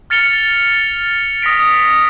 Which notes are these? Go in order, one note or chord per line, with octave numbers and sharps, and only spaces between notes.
F6 A6 C#7 F7 G7
D#6 A#6 B6 D7